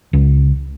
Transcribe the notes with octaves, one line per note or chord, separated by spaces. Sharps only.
C#2